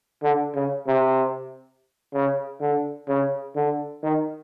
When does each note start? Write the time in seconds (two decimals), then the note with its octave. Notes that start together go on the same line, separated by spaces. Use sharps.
0.23 D3
0.55 C#3
0.87 C3
2.13 C#3
2.60 D3
3.08 C#3
3.56 D3
4.03 D#3